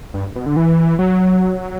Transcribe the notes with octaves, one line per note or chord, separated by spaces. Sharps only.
G2
B2
D3
E3
F#3